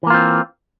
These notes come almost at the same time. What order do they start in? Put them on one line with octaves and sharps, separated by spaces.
E3 A#3 F4 C4